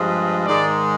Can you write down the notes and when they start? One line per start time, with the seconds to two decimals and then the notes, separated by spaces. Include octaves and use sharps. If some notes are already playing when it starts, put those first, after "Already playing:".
Already playing: G2 F3 G#3
0.46 G#2 D#3 G#3 D5